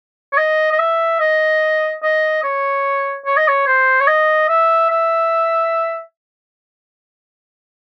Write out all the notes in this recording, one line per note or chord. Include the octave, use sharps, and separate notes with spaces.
C#5
D#5
D#5
E5
D#5
D#5
C#5
C#5
D#5
C#5
C5
C#5
D#5
E5
E5